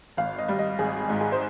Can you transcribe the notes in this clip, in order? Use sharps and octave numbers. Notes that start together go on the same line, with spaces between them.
G#1 F5
D#5
G3
D#5
G#1 G#4
G#2
G#4
C5